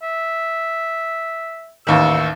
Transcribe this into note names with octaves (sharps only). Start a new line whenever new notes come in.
E5
A1 D#2 D#3 E6